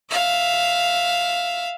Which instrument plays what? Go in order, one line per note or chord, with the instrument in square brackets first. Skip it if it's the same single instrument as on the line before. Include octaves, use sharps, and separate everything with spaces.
[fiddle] E5 F5